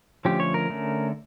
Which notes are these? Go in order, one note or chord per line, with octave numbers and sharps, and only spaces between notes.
D3 F3 A3 C#4 G4
C#5
A#4
D3 A3 C#4